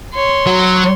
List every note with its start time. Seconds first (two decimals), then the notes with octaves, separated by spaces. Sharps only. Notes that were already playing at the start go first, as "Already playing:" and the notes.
0.14 C#5 C6
0.47 F#3